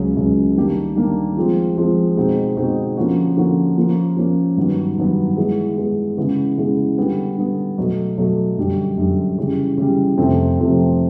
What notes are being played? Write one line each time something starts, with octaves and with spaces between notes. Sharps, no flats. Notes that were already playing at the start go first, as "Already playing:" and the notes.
Already playing: C#2 C#3 F#3
C#2 C#3 F#3
D#3 G3 A#3 D4 G4
D#3 G3 A#3 D4 G4
F3 G#3 C4 F4
F3 G#3 C4 F4
B2 G#3 C4 D#4 F#4
B2 G#3 C4 D#4 F#4
D3 F3 A#3 C#4 F#4
D3 F3 A#3 C#4 F#4
F3 A#3 C#4
F3 A#3 C#4
G2 D#3 F#3 B3
G2 D#3 F#3 B3
E3 G#3 B3
E3 G#3 B3
C#3 E3 G#3 B3
C#3 E3 G#3 B3
D3 G3 B3
D3 G3 B3
B2 F#3 A3
B2 F#3 A3
F#2 D3 G3
F#2 D3 G3
C#3 E3 G3
C#3 E3 G3
F2 C3 F3 A3 C4
F2 C3 F3 A3 C4